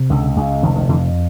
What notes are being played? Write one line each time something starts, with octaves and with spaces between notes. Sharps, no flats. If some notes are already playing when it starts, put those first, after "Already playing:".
Already playing: C3
C#2 D3
C#2
F1 D#3
D#3
F2 D3 E3